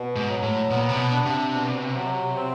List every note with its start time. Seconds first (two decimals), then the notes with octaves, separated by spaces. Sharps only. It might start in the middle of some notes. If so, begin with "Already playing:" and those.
Already playing: B2
0.16 G#2
0.29 F#3
0.43 A2
0.70 A#2 B3
0.89 C3
0.98 B2
1.12 D4
1.25 C3
1.53 B2
1.94 F#3
2.35 C4